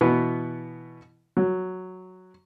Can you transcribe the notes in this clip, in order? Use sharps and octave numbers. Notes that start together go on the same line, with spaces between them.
B2 E3 B3
F#3